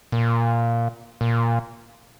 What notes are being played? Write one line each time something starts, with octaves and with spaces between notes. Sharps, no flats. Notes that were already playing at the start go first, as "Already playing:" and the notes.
A#2
A#2